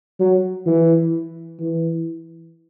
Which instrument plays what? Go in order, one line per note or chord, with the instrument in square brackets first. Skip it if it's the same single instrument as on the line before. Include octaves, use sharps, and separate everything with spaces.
[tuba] F#3
E3
E3